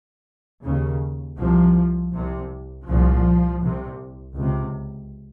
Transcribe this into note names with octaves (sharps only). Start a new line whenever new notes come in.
D#2 C#3
C2 C3 F3
C2 C3
C2 A#2 F3
C2 C3
C#2 C3